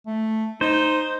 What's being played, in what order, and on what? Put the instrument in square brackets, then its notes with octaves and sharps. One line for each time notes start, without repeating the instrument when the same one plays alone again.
[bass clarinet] A3
[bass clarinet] D#4 [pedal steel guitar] C5